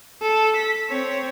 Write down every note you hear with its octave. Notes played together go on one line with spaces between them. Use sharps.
A4
B6
C4 C#5